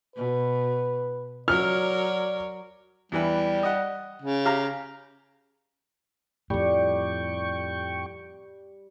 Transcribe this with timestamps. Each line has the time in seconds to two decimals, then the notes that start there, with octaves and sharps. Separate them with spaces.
0.16 B2 B4
1.48 F#3 A#4 C#5 D5 F6
3.12 E2 E3 G3 B4
3.63 D#5 F#5
4.22 C#3
4.45 G4 F5 A#5
6.50 F2 A2 G3 G5 C#6